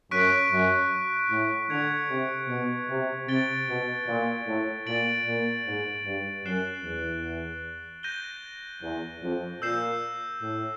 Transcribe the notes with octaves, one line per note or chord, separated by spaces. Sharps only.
F#2 C#6 F#6 B6 D7
F#2
A2
D3 G#6 C#7 F7
C3
B2
C3
C3 A6 D7 G7
B2
A#2
A2
A#2 A6 D7 F#7
A#2
G#2
G2
F#2 F#6 A6 C7 E7 G7
E2
G6 A#6 D#7 G7
E2
F2
A#2 E6 G6 C7 E7
A2